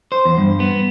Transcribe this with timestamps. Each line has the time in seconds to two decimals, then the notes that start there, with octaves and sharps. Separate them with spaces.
0.12 C5
0.25 E2
0.38 G2
0.60 B3